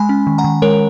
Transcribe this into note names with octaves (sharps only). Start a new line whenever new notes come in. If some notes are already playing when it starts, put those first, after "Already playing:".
Already playing: G#3 G#5 B5
C#4
D#3
F#5 A#5
D#3
G#3 A#4 C#5